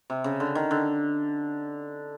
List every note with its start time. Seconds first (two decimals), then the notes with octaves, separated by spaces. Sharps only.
0.10 C3
0.24 C#3
0.40 D3
0.55 D#3
0.71 D3